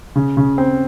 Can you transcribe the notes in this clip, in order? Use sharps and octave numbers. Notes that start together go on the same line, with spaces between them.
C#3
C#3
C4